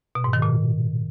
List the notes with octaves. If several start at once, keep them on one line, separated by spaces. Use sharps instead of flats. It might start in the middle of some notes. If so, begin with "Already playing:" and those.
B2
G#2
D#3
A#2